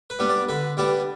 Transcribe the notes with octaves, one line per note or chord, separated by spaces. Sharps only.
B4
G3 B3 D4
D5
D3 B4
G3 B3 D4 D5